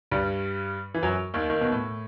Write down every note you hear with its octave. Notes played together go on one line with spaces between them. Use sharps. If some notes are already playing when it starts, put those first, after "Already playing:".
G2 G3
E3
F#2 F#3
D#2 D#3
D#2 D#3
B2
A2